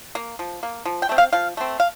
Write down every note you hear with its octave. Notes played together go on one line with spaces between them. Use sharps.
A#3
F3
A#3
F3
G5
A3 C4
F5
F3 F5
A3 C4
F5